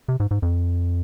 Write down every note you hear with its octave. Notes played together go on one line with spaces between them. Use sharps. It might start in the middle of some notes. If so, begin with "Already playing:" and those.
C3
G#2
G#2
F2